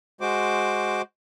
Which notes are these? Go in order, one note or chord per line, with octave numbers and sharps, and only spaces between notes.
G#3 F#4 C5 D6